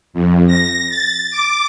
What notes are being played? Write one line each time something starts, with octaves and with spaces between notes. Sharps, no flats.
F2
A#6
A6
D6